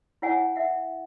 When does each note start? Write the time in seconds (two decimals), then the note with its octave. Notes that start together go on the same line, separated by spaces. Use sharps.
0.22 E4 C#5 F#5 G#5
0.56 E5 F#5